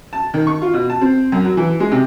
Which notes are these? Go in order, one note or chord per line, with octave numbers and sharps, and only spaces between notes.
A5
D#3
C#6
F4
B2
A5
C4
F#2
F#3
E3
G#3
C3